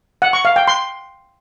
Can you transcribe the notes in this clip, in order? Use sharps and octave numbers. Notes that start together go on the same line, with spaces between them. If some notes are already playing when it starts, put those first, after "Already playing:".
F#5
C#6
F5
G5
C6